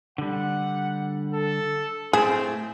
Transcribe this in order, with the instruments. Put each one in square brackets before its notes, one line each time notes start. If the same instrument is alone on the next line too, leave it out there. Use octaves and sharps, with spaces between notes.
[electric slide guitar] D3 G3 [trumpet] F#5
[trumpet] A4
[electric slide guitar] A2 A3 A5 [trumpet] C4 [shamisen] G#4